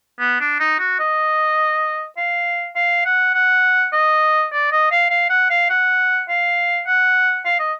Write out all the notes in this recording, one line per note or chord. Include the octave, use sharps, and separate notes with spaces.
B3
D4
D#4
F#4
D#5
F5
F5
F#5
F#5
D#5
D5
D#5
F5
F5
F#5
F5
F#5
F5
F#5
F5
D#5